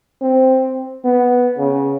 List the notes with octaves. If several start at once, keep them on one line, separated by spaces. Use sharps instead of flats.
C4
B3
C#3